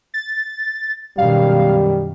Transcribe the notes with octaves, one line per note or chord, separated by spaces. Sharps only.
A6
F#2 B2 D#3 G3 F5